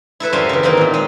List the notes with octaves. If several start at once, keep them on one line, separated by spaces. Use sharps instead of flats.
E4 A4 B4 E5
F#2 G3 C5 D#5 F5
C#3 E3
D#3 E3 A#3 C4 D#4
A#2 D#3
G#3 D#5